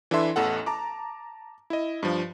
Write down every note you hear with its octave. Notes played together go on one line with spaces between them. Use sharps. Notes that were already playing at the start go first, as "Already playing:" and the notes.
E3 D4 E4 A4 E5 C6
A1 E2 A4 F#5
A5 A#5 D6
E4 D#5
G2 F3